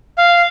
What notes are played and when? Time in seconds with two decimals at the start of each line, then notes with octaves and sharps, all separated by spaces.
0.18 F5